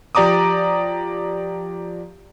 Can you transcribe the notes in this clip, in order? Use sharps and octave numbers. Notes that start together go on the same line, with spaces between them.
F3 G4 D5 A#5 D6 D#6